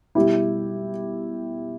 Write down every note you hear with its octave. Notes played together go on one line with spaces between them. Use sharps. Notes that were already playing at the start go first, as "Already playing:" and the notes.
B2 G3 E4 G4